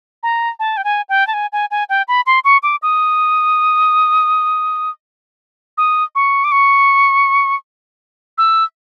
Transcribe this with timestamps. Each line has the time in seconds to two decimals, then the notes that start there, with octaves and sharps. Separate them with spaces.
0.23 A#5
0.60 A5
0.77 G5
0.84 G#5
1.09 G5
1.27 A5
1.34 G#5
1.53 G#5
1.71 G#5
1.89 G5
2.08 B5
2.26 C6
2.44 C#6
2.63 D6
2.82 D#6
5.78 D#6
6.15 C#6
6.44 D6
6.52 C#6
8.38 E6